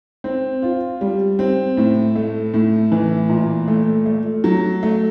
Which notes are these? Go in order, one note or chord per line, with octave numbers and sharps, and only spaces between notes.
C4
F4
G3
C4
A2
A3
A2
E3
A#2
A3
A3
F#3
A3